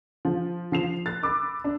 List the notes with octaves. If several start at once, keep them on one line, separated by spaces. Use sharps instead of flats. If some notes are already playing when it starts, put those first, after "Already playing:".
F3
F3 C7 F7
F#6 A6
B5 D6 E6
D4